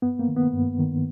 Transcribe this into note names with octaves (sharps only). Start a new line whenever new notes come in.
G2 B3
A#3
D#3
B3
G2
D#3